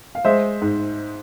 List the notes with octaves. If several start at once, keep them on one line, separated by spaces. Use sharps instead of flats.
F5
G#3 C5 E5
G#2